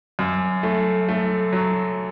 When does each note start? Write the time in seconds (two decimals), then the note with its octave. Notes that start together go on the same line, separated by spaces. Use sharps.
0.19 F#2
0.63 A3
1.09 A3
1.53 F#3